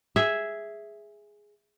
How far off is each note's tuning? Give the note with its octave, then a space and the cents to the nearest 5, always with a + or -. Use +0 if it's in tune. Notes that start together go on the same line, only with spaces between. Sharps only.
G#4 +0 E5 +0